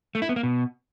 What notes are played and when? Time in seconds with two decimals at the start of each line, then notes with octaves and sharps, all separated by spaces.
0.15 A3
0.22 E4
0.29 B3
0.36 A#3
0.43 B2